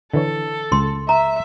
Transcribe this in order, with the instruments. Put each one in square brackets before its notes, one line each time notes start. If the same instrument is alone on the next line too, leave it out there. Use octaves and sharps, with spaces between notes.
[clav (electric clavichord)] D3 E3 C#5 [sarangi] A4
[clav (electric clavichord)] C#2 [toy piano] C6
[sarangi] E5 [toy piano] A#5